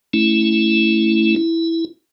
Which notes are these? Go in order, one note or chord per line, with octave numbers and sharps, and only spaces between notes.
A3 C#4 E4
E4